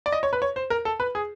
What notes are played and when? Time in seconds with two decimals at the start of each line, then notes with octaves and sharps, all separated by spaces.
0.06 D5
0.12 D#5
0.23 C#5
0.33 B4
0.42 C#5
0.56 C5
0.70 A#4
0.85 A4
1.00 B4
1.15 G#4